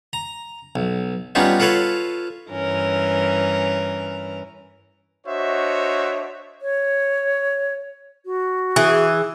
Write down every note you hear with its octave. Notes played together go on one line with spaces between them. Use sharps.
A#5
B1
G3 B3 C#4 D#4 F4
F4 A4 B4 C#5 F5
G2 E3 C#4 A#4
D4 F#4 C5 C#5 D#5 E5
C#5
F#4
E3 G#4